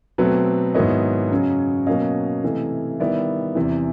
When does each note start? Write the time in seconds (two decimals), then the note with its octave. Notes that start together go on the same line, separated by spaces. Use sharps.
0.18 B2 F#3 A3 C4 A4 B4
0.74 G#2 D#3 F#3 B3 E4 C#5 D#5
1.31 F#2 C#3 F#3
1.87 B2 F#3 A#3 C#4 D#5 F5
2.44 C3 E3 A3
3.00 D#3 G3 B3 E4 D5 E5
3.55 E2 C3 E3